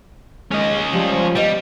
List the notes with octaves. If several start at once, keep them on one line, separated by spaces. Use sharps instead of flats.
D#2 G#3 C#4 D#5
F3 G3 G4
G3 B3 G4 D#5